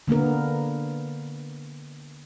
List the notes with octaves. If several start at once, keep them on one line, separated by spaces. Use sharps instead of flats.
D3 A#3 B3 A#4